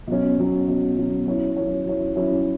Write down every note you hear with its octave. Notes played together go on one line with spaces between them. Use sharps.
B2 F#3 C#4
B2 F#3 C#4
B2 F#3 C#4
B2 F#3 C#4
F#3 C#4 E4 C#5
F#3 C#4 E4 C#5
F#3 C#4 E4 C#5
F#3 C#4 E4 C#5